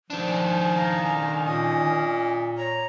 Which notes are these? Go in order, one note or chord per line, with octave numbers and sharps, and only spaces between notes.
D#3 F3 D4
G#5
F5 A#5
A#2 C#4 D#5
C#5 A#5